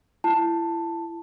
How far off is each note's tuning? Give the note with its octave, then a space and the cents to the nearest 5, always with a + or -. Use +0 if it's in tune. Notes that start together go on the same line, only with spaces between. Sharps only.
E4 +30 A5 +10